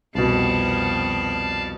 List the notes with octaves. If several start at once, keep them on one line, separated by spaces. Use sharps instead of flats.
C2 F2 B2 B3 D5 F5 A5